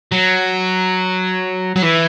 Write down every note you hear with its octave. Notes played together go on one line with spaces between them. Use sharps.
F#3
F#3
E3